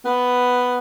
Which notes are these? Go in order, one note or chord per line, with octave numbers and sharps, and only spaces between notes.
B3